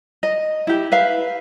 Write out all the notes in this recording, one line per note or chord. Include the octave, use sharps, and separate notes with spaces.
D#5
E4 G4
B4 E5 F5